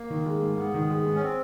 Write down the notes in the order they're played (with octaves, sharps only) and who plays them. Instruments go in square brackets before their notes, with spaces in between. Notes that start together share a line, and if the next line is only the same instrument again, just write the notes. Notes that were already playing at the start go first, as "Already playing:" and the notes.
Already playing: [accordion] A#3
[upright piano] D#3
G#3
G#2
[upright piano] G#2 [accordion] B3
[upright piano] D#3
G#3
G#2
[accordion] C#4
C4